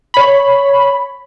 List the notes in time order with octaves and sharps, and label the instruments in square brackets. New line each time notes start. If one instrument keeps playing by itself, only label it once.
[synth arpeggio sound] C#5 B5